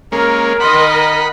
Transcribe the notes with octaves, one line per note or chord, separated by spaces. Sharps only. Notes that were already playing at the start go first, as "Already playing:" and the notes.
G#3 A#3 C#4 A#4 A#5
D#3 D#5 F#5 B5 C6
A#5